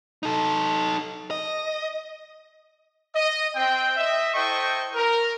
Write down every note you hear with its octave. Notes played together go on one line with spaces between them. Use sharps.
D#4 A4
D#5
D#5
C4 G5
D#5 E5
E4 A4 C5 D#5 G5 C#6
A#4